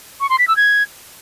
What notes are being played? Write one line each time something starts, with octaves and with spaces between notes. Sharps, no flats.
C#6
C6
B6
E6
G#6